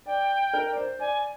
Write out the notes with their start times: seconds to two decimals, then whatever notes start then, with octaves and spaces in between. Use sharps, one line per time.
0.06 D5 G5
0.54 A#4
0.71 D5
0.77 C5
0.99 D5 G#5